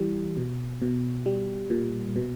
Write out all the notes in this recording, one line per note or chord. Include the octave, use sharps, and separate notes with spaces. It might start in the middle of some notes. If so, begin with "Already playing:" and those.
Already playing: E3 G3
B2
B2
G3
A#2
B2